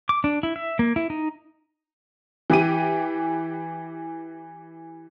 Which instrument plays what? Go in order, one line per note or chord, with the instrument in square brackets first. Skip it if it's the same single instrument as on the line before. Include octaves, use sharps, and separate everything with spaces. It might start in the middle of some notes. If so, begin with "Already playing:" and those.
[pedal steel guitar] D6
D4
E4
E5
A#3
E4
D#4
[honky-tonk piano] E3 G4 D#7